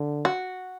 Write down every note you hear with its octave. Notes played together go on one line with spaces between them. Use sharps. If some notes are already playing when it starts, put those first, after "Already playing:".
Already playing: D3
F#4